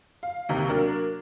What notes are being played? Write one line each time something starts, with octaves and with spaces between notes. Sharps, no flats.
F5
D#2 C3
F#3 A#3 D4 A#4